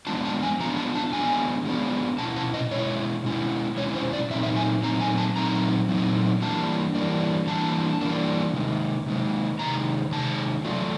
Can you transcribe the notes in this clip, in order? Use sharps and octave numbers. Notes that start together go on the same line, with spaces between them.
F3 G#3 B3 D4 F4 A5
A5
G#5
F3 G#3 B3 D4 F4 A#5
A5
A5
F3 G#3 B3 D4 F4 G#5
F3 G#3 B3 D4 F4
B2 G#3 C#4 E4 A5
A5
D#5
B2 G#3 C#4 E4 C#5
B2 G#3 C#4 E4
B2 G#3 C#4 E4 C#5
C5
D5
A#2 F#3 A3 C4 D#4 E5
E5
G#5
A#2 F#3 A3 C4 D#4 A#5
G#5
A5
A#2 F#3 A3 C4 D#4 A#5
A#2 F#3 A3 C4 D#4
E3 G3 A#3 D4 A5
E3 G3 A#3 D4
E3 G3 A#3 D4 A5
E3 G3 A#3 D4
C3 D#3 G#3
C3 D#3 G#3
C3 D#3 G#3 A#5
C3 D#3 G#3 A5
F#3 A3 D4 F4